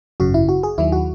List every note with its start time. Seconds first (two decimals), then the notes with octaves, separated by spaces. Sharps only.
0.20 G#1 F#2 C#3 F#4
0.34 E4
0.49 F#4
0.63 G#4
0.78 D#2 D#3 F#3 E4
0.92 F#4